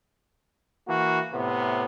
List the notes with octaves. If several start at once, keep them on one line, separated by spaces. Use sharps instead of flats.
E3 A#3 F#4
A2 C3 B3